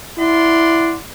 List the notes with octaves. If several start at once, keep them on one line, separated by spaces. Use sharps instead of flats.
E4 D5 F#5 C6